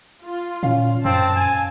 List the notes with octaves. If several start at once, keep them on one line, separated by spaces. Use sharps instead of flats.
F4
A#2 C#4 F5
F#2 C4 A5
G#5